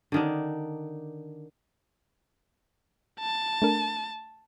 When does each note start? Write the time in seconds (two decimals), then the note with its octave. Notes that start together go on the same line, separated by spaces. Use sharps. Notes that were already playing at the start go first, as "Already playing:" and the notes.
0.12 D3 D#3 D4
3.20 A5
3.62 A3 D4 A#4